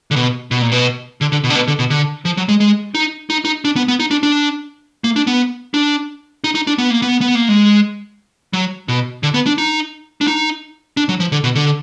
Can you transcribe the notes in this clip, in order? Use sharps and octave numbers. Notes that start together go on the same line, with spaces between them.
D3
B2
B2
A#2
B2
D3
D3
B2
D3
B2
D3
B2
D3
F3
F#3
G#3
G#3
D#4
D#4
D#4
D4
B3
B3
D#4
D4
D4
A#3
D4
B3
D4
D#4
D#4
D4
B3
A#3
B3
B3
A#3
G#3
F#3
B2
D3
B3
D4
D#4
D4
D#4
D4
F#3
F3
D3
B2
D3